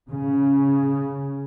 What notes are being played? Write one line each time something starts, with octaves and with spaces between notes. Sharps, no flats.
C#3